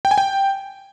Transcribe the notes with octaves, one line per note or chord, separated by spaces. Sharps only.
G5
G#5
G5